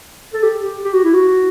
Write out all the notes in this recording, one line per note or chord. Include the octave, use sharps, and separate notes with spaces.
A4
G4
G4
G4
F#4
E4
F#4